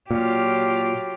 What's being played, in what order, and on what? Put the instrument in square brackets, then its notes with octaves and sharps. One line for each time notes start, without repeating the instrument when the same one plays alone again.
[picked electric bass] A#2 [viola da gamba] F#3 F4 G4